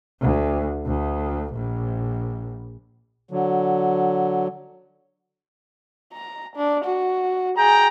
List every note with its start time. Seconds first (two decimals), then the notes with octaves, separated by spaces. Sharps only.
0.21 D2
0.86 D2
1.54 A#1
3.31 D3 F#3
6.13 A#5
6.56 D4
6.84 F#4
7.58 G#4 G5 A#5